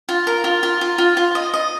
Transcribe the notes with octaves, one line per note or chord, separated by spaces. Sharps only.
F4
A#4
F4
F4
F4
F4
F4
D#5
D#5